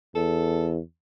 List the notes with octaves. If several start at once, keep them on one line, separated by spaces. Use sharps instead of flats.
E2 A4